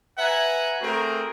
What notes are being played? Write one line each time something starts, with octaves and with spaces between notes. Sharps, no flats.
B4 E5 F#5 G#5 A#5
A3 C4 F#4 G#4 A#4